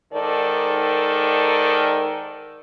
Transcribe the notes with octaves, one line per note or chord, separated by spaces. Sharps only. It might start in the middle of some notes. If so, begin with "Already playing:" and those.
G#2 D#3 A4 D5